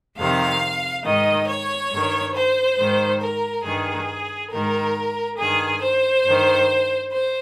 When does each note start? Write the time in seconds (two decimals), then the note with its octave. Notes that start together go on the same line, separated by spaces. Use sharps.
0.18 F2 C3 D#3 F5
1.04 G#2 D#3 D#5
1.48 C#5
1.91 G2 D#3
2.35 C5
2.78 G#2 D#3
3.22 A#4
3.65 G2 D#3 G#4
4.51 G#2 D#3 A#4
5.38 G2 D#3 G#4
5.82 C5
6.26 G2 D#3
7.11 C5